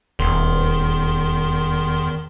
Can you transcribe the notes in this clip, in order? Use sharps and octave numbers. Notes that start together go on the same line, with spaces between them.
D#1 E2 D#3 C6